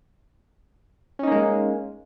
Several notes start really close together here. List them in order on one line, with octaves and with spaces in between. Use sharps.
C#4 D#4 A#3 G#3